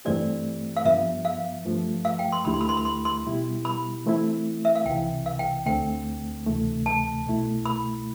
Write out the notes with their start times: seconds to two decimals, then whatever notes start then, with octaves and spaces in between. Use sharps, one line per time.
0.05 G2 E3 A3 C4 G4 D5
0.77 F5
0.85 G2 F3 B3 E5
1.25 F5
1.65 G2 F3 A3
2.05 F5
2.19 G5
2.32 C6
2.45 D2 D3 A3 E4 G4 B5
2.54 C6
2.61 B5
2.69 C6
2.77 B5
2.85 C6
3.05 C6
3.26 B2 G3 B3 E4 G4
3.65 B5
4.06 E3 A3 C4 E4
4.65 E5
4.76 F5
4.86 C2 C3 E3 G5
5.26 F5
5.39 G5
5.65 D2 D3 A3 C4 G5
6.46 D2 C3 E3 A3
6.86 A5
7.27 C2 B2 A3 E4
7.66 B5